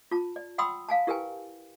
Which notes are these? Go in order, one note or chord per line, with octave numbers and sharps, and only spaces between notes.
F4 A5
D5
F#5 G5 B5 C6 D#6 E6
F5 G#5 A5
E4 G4 A#4 B4 G5 G#5